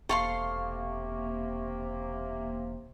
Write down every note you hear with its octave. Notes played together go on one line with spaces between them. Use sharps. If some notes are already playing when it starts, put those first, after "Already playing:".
E1 C3 A#3 A4 F5 C6 C#6